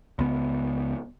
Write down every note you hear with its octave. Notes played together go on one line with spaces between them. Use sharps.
C#2 B3